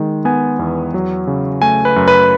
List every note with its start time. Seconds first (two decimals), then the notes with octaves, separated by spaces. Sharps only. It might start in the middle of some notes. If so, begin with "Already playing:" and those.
Already playing: D#3 G#3
0.25 B3 G#5
0.59 E2
0.94 F#3
1.27 C#3
1.62 A3 G#5
1.85 B4
1.96 F#2
2.08 B4